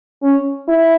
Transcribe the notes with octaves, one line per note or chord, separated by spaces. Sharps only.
C#4
E4